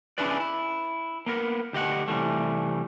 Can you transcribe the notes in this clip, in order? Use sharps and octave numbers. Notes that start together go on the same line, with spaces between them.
C#4 D4 E4 G#4 B4 D5
E4
A#3 B3 A#4
D2 G4 D#5 F#5
C3 E3 G3 A3